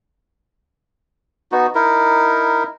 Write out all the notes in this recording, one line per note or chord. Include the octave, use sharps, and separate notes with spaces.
B3 D#4 F#4
D#4 E4 A#4